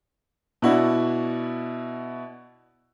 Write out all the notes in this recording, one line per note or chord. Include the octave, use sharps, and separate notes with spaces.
B2 D4 E4 F#4